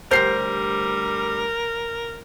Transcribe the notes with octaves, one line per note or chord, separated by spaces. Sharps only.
D2 G3 G4 A#4 C5 G6 C7